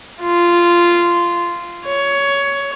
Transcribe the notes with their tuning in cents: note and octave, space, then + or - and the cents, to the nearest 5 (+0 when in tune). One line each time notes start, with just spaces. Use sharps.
F4 -10
C#5 +15